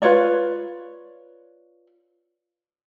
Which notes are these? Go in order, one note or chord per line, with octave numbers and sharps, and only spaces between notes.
F4 B4 C#5 D5